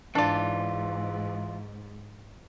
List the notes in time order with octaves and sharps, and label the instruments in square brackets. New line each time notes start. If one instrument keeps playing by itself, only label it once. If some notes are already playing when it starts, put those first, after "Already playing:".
[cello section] G#2 [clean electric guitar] E3 F4 [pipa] D4 D5